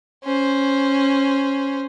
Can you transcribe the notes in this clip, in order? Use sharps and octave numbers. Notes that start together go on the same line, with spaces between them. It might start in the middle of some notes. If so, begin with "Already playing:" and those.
C#4 C5